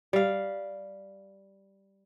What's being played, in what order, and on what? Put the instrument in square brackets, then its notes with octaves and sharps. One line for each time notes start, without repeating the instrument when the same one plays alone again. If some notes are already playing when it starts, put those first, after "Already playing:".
[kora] G3 F5